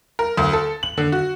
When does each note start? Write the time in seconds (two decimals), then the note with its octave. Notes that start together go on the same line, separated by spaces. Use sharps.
0.19 A#4
0.37 D2
0.53 A4
0.83 F#7
0.97 D3
1.12 F#4